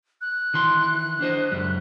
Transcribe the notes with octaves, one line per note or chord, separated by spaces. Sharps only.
F#6
D#3 E3 C6
D4 C5 D#5
C#2 F#2 G3